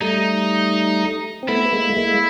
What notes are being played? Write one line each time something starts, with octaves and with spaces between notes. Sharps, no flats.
G3 A3 D#4
C4
A3 B3 E4
G#3 A#3
A3
G#3 A#3